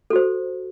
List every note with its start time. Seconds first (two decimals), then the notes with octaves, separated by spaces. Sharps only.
0.10 A4
0.13 F#4
0.16 C5